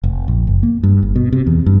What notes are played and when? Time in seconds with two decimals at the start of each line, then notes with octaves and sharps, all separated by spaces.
0.04 F1
0.28 A#1
0.47 F#1
0.63 A#3
0.83 G2
1.03 G1
1.16 B2
1.33 C3
1.47 E2
1.66 G2